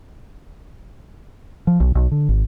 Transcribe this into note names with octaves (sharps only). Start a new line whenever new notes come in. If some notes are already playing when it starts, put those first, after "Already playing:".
F3
B1
B1
D3
G#1